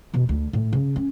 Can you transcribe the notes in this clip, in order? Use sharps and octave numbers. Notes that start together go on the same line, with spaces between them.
E1 B2
D2
A2
C#3
C#4